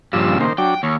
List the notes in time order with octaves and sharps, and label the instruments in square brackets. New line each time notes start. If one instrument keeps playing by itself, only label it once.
[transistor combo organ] G2 F3 E6 [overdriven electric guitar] A#2 C#3
[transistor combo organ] D#3 A#3 C5
[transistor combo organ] F#3 D4 [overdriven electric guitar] G5
[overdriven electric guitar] D#2 [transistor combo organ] C#5